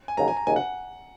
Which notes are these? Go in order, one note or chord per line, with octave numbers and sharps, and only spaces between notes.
G#5
D#2 C#3 F#3 A#5
G#5
A#5
D#2 C#3 F#3 G#5
F#5